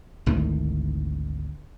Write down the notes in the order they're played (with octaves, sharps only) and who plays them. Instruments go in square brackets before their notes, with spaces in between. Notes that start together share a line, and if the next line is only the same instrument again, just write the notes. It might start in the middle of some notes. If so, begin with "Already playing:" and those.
[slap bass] G#1 D2 D#3 E3